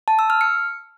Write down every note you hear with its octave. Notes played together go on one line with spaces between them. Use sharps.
A5
E6
F6
C#7